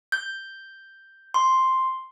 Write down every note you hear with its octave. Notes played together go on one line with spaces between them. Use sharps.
G6
C6